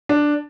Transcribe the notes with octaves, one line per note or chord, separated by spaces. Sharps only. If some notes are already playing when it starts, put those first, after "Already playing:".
D4